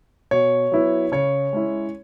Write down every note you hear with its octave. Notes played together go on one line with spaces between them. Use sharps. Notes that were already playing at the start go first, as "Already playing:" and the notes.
B2 C#5
F#3 B3 E4
C#3 C#5
G#3 C#4 E4